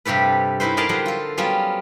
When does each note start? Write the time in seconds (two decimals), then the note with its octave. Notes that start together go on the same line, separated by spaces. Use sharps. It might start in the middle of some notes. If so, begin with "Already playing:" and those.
0.05 G2 C3 G4 A4 B4
0.60 C#4 D#4 E4 B4 C5
0.77 G#4 A#4 D5 D#5 F5 A5
0.89 D3 F#3 G3 C5 D#5 F#5
1.06 F4 A4
1.37 F#3 G3 B3 C#4 F4